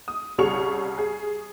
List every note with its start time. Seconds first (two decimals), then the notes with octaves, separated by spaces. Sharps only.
0.08 D#6
0.38 C2 C#3 G3 G#4 C#6 F7
0.98 G#4